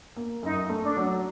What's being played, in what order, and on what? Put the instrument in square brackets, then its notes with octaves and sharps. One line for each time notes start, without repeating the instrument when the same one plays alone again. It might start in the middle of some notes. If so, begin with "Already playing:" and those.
[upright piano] A#3
[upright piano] F#2 [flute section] D#4
[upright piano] A3
[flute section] D4
[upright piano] F#3